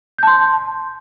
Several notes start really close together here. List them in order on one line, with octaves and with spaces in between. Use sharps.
G6 A5 C6